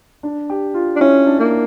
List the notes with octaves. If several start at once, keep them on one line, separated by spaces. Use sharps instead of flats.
D4
G4
F4
D4
C#4 E4
D4
A#3